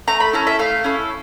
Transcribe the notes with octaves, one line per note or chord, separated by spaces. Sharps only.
A3 A#5
B5
C#4 E4 A4 A#5
E5
A3 F5
C#4 E4 A4